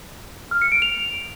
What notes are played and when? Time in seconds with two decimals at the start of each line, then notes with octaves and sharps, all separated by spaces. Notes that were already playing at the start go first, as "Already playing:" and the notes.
0.51 F6
0.62 C#7
0.72 D7
0.82 F7